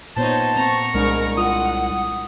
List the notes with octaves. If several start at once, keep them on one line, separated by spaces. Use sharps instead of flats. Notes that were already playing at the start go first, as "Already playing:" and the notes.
A#2 B3 D#4 C5 C#5 A5
C4 A#5 C#6
C2 G#3 D4 A#4
F4 F#5 D#6